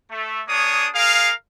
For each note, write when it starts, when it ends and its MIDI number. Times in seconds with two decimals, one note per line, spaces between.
0.11 0.42 57
0.48 0.88 58
0.48 0.88 62
0.48 0.88 68
0.48 0.88 73
0.48 0.88 87
0.95 1.32 68
0.95 1.32 70
0.95 1.32 77